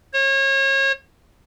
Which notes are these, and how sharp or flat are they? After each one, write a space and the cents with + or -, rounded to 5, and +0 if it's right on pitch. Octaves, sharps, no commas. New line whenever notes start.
C#5 -35